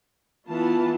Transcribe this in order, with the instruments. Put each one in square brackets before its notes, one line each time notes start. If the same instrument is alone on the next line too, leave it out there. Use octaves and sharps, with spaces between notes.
[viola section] E3 B3 F4 A5